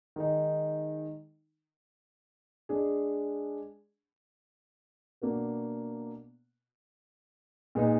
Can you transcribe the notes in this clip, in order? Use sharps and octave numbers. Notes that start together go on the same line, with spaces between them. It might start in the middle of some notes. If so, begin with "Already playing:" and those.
D#3 G#3 D#4
G#3 D4 G#4
B2 A#3 D4 F#4 B4
A#2 G#3 B3 D#4